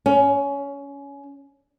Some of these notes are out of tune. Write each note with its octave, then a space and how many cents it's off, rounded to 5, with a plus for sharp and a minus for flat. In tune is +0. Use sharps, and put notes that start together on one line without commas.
C#4 +20